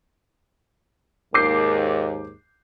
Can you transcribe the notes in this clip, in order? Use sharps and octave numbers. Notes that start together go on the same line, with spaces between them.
D#2 G#2 D6 G6 C7